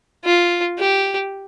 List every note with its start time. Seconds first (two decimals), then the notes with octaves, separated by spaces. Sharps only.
0.25 F4
0.79 G4